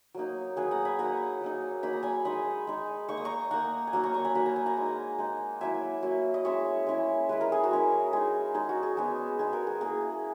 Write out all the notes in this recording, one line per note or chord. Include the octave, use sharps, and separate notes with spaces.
F#3 A#3 D#4
F#3 A#3 D#4 G#4 B4
F#5 A#5
G#5 B5
F#3 A#3 D#4 F#5 A#5
F#3 A#3 D#4
F#3 A#3 D#4 B5
A#5
G#5 B5
G#3 D#4 B5 D#6
G#3 D#4
A#3 D#4 C#6
D#6
A#5 C#6
A#3 D#4 F#5 A#5
G#5
F#3 A#3 D#4 F#5 A#5
A#5 C#6
A#5 C#6
G#5 B5
F#3 A#3 D#4 B5
A#5
G#5
F#5 A#5
G#3 D#4
G#3 D#4
F#3 A#3 E4 E5 G#5
F#3 A#3 E4
D#5
G#3 C#4 E4 C#5 E5
G#3 C#4 E4
G#3 C#4 E4 B4
A#4
G#4
F#4 A#4
G#3 C#4 E4
G#3 D#4 G#4
G#3 D#4 G#4
F#4
G#4
G#3 B3 D#4 F#4
G#3 B3 D#4 G#4
F#4 A#4
G#4
A#3 E4 G#4